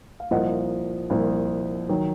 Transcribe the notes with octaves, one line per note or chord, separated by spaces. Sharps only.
F5
C2 A#2 F3 D#5 F#5
C2 A#2 F3
D#3 F#3